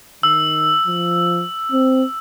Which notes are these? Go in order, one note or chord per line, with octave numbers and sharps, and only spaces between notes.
D#3 E6
F3
C4